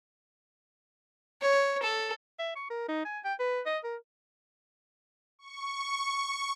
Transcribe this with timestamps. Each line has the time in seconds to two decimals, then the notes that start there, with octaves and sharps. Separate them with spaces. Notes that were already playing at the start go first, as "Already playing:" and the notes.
1.42 C#5
1.83 A4
2.39 E5
2.56 C#6
2.70 A#4
2.88 D#4
3.05 G#5
3.25 G5
3.39 B4
3.66 D#5
3.84 A#4
5.39 C#6